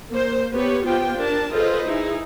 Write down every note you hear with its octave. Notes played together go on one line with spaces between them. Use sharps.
A#3 C5
B3 G4 B4 C#5
B3 F4 G4 C5 G5
D4 A#4 A5
F4 G#4 A4 B4 C5 D#5
D#4 E4 G#4